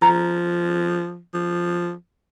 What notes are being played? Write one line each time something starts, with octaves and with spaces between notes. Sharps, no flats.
F3 A#5
F3